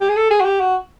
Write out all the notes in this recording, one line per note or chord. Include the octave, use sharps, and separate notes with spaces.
G4
G#4
A4
G#4
F#4
G4
F#4